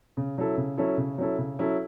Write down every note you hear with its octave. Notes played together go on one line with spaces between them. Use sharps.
C#3
F#3 C#4 E4 A4
C#3
F#3 C#4 E4 A4
C#3
F#3 C#4 E4 A4
C#3
F#3 C#4 E4 A4